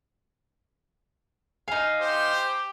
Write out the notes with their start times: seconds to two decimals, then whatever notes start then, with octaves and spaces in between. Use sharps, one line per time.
1.68 D#4 F5 G#5
2.01 G4 C5